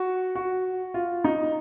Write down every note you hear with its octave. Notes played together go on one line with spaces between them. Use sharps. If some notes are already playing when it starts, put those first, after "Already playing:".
Already playing: F#4
F#4
F4
D#4